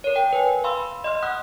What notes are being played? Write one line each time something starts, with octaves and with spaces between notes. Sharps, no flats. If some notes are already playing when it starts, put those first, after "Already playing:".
A#4 C#5
G5
B4 G#5
F5 B5 C6 E6
D#5 C6 F6
F#5 D#6 F6 F#6